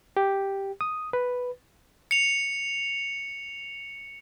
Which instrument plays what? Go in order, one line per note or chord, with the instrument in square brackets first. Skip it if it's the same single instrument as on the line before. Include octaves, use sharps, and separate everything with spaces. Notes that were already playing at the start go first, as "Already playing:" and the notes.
[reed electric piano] G4
D#6
B4
[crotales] C#7 F7